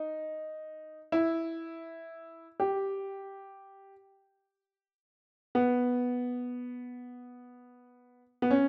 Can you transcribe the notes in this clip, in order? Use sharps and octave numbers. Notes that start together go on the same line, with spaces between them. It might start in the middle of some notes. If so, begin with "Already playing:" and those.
Already playing: D#4
E4
G4
B3
B3
C#4